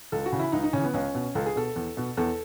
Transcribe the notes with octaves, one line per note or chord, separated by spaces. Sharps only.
C#2 A4
F#4
C#3 E3
E4
C#2 D#4
D#4
C#3 E3 C#4
B3
C#2 C#4
B2
C#2 A4
G#4
B2 A4
E2
B2
E2 A4